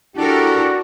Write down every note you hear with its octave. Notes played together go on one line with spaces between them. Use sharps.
D4 E4 F#4 G4 A4 A#4